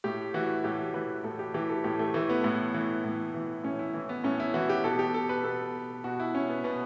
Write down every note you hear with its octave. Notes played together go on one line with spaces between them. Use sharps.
A2 G4
E3 F#4
A2 G4
E3 B4
A2 A4
G4
E3 G4
A4
A2 G4
A3
E3 A3
B3
A2
E3
A2
E3
A2 C#4
E4
E3
B3
A2 C#4
E4
E3 F#4
G4
B2 A4
G4
A4
B4
B2 A4
B2 F#4
E4
C#4
B3
B2 B3